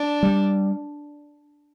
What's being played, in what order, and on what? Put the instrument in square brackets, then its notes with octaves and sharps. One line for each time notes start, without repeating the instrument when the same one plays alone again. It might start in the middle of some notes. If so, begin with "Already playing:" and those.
Already playing: [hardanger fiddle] D4
[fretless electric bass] G3